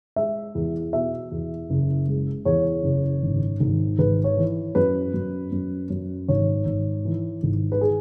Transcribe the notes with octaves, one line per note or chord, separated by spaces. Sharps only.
G#3 E5
E2
B2 E5
E2
F#1
G#3
E2 C#5
F#1
G#1
G#1
G#1 B4
C#5
E3
F#2 B4
F#2
F#2
F#2
G#1 C#5
G#1
E3
G#1
B4
G#4